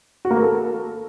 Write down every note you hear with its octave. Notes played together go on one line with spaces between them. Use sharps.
F#4
A#3
A#4
A4